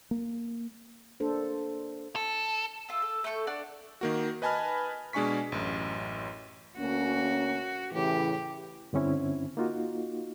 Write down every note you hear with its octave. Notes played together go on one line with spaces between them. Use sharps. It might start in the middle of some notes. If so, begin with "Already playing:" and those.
A#3
A#3 D4 A4 C5
A4
F4 A4
A4
A3 A4 C#6 G6
D4 D5 F#5
D#3 A#3 F#4
B4 D#5 G#5 A5 B5 F6
B2 G#3 D4 G#5 C#6 B6
A1 F#2
D2 A#3 C#4 F#4
A2 C#3 E3 G4
G2 D3 C4 C#4 E4
A#3 D#4 F4 F#4